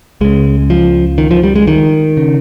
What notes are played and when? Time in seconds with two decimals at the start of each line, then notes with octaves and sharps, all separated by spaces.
0.21 C#2 C#3 G#3
0.70 F3
1.18 D#3
1.31 F3
1.43 G3
1.56 G#3
1.68 D#3
2.17 C#3